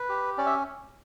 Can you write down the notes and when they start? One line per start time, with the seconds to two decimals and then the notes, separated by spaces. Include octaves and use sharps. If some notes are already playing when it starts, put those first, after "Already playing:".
Already playing: B4
0.09 G4
0.38 C#4 D5
0.46 E5